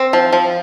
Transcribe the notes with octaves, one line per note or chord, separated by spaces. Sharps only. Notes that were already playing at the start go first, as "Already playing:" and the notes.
Already playing: C4
F3
F3